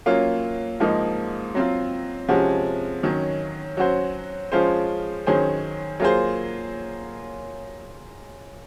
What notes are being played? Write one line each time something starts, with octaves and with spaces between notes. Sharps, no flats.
F#3 A#3 C#4 F4
G#2 F3 A#3 D#4
F#3 C4 F4
C3 F3 G#3 C#4 F#4
D#3 F#3 C#4
F#3 C#4 F#4 C5
F3 G#3 C#4 F4 C5
D#3 F#3 C#4 G#4 C5
F#3 A#3 F4 G#4 C5